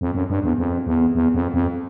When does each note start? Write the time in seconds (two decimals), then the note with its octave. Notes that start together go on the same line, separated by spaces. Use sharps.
0.01 F2
0.14 F#2
0.30 G2
0.43 E2
0.58 F2
0.87 E2
1.15 E2
1.34 F2
1.54 F2